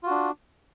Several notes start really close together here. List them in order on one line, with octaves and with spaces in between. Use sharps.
F4 F#4 D4